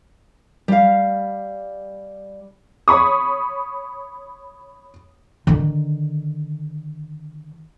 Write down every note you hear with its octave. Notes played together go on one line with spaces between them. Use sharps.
G3 F5
C#5 B5 C#6 D#6
D3 D#3